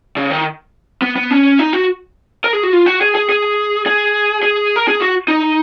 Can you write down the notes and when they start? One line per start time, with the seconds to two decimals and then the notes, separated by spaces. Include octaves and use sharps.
0.17 C#3
0.31 D#3
1.02 B3
1.16 B3
1.31 C#4
1.59 D#4
1.73 F#4
2.44 A#4
2.53 G#4
2.63 F#4
2.73 F4
2.86 F#4
3.01 G#4
3.15 G#4
3.29 G#4
3.86 G#4
4.43 G#4
4.76 A#4
4.88 G#4
5.00 F#4
5.28 D#4